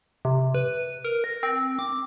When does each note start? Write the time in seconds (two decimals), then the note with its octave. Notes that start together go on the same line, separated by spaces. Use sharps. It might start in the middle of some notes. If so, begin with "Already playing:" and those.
0.25 C3
0.55 B4
1.05 A#4
1.24 A#6
1.43 C4
1.79 D6